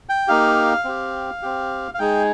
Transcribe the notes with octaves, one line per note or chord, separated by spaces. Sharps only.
G5
A#3 D#4 G4 F5
C4 G4
C4 G4
F5
G#3 D#4 G#4 G5